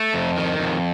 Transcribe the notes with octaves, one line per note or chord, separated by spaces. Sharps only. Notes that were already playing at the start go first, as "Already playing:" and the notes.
Already playing: A3
F2
D#3
F2